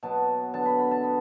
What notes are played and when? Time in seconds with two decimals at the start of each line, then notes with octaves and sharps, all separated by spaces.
0.03 B2 F#3 B3 A5
0.53 D3 F#3 B3 A5
0.66 B5
0.79 B5
0.91 A5
1.04 B3